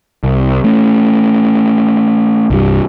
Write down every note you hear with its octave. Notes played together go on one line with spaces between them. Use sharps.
C2
A3 C#4
C2 G2 G3